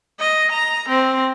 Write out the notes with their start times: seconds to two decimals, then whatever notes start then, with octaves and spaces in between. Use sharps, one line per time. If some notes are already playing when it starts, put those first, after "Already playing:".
0.19 D#5
0.52 A#5
0.88 C4